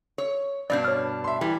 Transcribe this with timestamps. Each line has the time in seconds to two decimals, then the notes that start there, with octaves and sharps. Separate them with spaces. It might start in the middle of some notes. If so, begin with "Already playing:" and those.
0.18 C#5
0.70 G2 B2 D4 D5 G6
0.84 C#5 F6
1.24 E5 C6
1.41 E3 G3